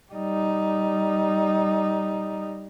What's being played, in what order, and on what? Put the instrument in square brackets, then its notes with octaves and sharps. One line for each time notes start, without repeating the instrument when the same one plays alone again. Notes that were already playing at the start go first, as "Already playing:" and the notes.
[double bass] G3 D#4